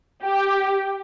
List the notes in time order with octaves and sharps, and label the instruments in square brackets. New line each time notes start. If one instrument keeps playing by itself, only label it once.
[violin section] G4